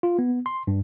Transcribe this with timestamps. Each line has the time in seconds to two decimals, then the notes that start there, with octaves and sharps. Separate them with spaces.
0.03 F4
0.19 B3
0.46 C6
0.67 G2